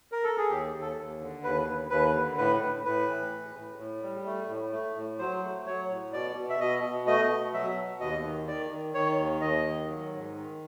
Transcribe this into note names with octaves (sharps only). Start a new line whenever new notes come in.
A#4
A4
G#4
D#2 G4
D#2
A4
D#2
D3
D#2 B4
D#2
D#2 B4
D3
A2 B4
A2
A2 B4
E3
A2
A2
A2
G3
A3
A2
A3
A2
F#3 C5
A3
F#3 C#5
A2
B2 D5
B2
E5
B2 D#5
B2
A3 D#5
B2
F#3 E5
B2
D#2 D#5
D#3
D#3 D5
D#3
D#3 C#5
D#2
D#2 D#5
D#3
F#3
G#2
D#3